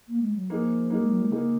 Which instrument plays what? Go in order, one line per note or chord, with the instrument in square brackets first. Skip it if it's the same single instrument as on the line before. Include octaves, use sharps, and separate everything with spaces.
[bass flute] A#3
G#3
F#3
[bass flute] F3 [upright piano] A#3 D#4 G#4
[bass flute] F#3 [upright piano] A#3 D#4 G#4
[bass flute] G#3
F#3
G#3
[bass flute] C#3 [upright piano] A#3 D#4 G#4